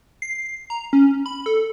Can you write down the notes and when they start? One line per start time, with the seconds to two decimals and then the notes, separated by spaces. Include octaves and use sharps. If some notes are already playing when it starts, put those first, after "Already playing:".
0.22 C7
0.70 A#5
0.93 C#4
1.26 B5
1.46 A4